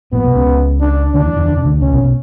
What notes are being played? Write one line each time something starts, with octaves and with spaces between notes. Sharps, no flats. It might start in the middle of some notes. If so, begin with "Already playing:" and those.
A#1 A#2 B3
B1 B2
C#2 C#3
D4
D2 D3 D4
E2 E3
E2 E3
D3
C#3
D2 D3
C#2 C#3 C#4
B1 B2
B2